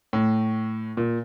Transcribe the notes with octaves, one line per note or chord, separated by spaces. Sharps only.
A2
A#2